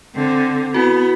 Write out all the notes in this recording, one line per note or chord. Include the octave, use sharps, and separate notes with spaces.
D3 C4
B3 E4 F#4